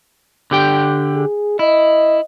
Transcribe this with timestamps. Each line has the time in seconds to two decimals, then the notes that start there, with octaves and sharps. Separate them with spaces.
0.51 D3 G4 G5
1.14 G#4
1.59 E4 D#5